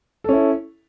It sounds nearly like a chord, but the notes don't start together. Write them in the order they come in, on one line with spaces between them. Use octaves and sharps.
A4 C#4 E4